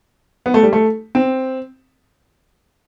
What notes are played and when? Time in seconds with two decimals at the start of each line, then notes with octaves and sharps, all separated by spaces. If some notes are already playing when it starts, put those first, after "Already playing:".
0.46 B3
0.54 A3
0.63 G3
0.73 A3
1.15 C4